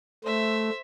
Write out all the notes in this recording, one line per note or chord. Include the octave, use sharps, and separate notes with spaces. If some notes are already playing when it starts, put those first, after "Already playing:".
A3 C5 E5